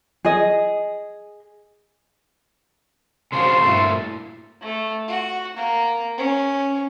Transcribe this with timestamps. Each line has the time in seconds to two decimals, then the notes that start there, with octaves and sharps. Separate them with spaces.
0.25 G#4 D#5
3.32 C#3 F3 D4 F#4 C5 F5 C6
3.62 G2 A#2 A3 E4
4.62 A3
5.08 F#4
5.57 A#3
6.17 C#4